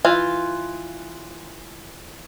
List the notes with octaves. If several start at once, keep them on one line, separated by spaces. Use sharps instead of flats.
E3 F4